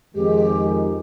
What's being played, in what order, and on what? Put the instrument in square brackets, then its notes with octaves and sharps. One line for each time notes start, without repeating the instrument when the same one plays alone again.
[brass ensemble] F2 D#3 G#3 [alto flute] G4